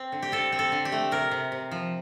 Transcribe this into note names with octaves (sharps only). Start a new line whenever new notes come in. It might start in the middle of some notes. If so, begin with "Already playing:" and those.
Already playing: C4
D3
G4
C4 A4
C4
A4
D3
G4
A3
C3 A#4
C3
C3
F3